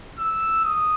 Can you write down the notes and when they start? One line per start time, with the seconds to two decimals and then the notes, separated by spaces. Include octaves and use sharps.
0.18 E6
0.65 D#6